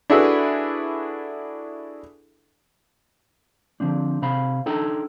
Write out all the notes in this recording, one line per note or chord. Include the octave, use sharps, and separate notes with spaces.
D4 E4 F#4 G#4 A4 B4
D3 F3 C4 D4
C3 C4 F5 B5
D4 D#4 A4 G5